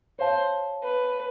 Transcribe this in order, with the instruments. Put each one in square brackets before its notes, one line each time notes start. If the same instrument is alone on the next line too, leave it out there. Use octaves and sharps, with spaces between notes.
[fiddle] C5 [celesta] C#5 F5 A5
[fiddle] B4